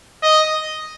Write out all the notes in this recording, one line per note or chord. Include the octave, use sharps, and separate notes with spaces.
D#5